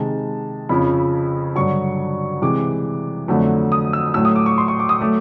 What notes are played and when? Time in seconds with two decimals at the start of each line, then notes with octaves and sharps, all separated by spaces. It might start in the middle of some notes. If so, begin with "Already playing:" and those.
Already playing: C3 D#3 G#3 A5
0.69 F2 C#3 F3 B5
1.56 G2 D3 F#3 C#6
2.42 C3 E3 G#3 D6
3.28 F2 D3 F#3 A3
3.72 D#6
3.93 E6
4.14 A2 F#3 A3 E6
4.25 D#6
4.36 D6
4.46 C#6
4.58 C6
4.68 C#6
4.80 D6
4.89 D#6
5.00 F#3 A3 D6